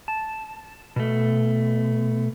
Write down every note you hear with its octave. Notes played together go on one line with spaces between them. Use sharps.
A5
B2 A3